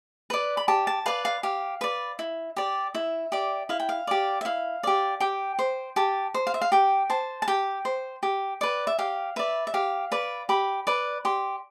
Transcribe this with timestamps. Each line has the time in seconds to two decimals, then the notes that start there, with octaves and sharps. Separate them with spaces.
0.30 B4 D5
0.57 B5
0.68 G4 A5
0.87 A5
1.06 B4 D5 F5
1.25 F5
1.43 G4 F5
1.81 B4 D5
2.19 E4
2.56 G4 D5
2.94 E4 E5
3.32 G4 D5
3.69 E4 F5
3.80 G5
3.89 F5
4.07 G4 D5
4.41 E5
4.45 E4 F5
4.83 G4 D5
5.20 G4 G5
5.59 C5
5.96 G4 A5
6.34 C5
6.47 F5
6.54 E5
6.61 F5
6.72 G4 G5
7.10 C5 A5
7.42 A5
7.48 G4 G5
7.85 C5
8.23 G4
8.61 B4 D5
8.87 E5
8.99 G4 F5
9.36 B4 D5 E5
9.67 E5
9.74 G4 F5
10.12 B4 D5
10.49 G4 B5
10.87 B4 D5
11.25 G4 C6